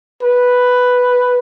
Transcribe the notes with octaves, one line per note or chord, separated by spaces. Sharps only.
B4